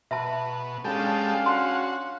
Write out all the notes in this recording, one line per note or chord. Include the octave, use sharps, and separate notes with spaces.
B2 E5 A5
G#3 C#4 D4 G4 A4 F5
F#4 C6